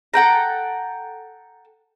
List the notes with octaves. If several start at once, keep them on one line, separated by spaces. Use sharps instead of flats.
A4 F#5 G5 A#5